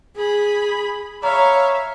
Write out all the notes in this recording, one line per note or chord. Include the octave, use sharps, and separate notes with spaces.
G#4 B5
C#5 E5 F5 A#5 B5